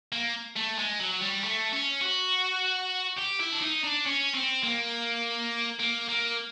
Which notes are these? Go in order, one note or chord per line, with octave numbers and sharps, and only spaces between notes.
A#3
A3
G#3
F#3
G3
A3
C#4
F#4
G4
E4
D4
D#4
D4
C#4
C4
A#3
A#3
A#3